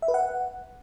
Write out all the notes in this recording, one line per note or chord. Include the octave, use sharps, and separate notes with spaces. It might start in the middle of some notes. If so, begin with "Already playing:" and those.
E5
B4
F#5